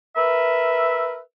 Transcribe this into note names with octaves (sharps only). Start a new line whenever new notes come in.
A#4 B4 E5